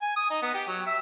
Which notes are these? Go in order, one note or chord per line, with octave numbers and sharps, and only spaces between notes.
G#5
D#6
D#4
B3
G4
F#3
E5